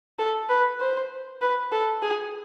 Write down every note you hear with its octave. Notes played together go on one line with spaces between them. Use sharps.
A4
B4
C5
B4
A4
G#4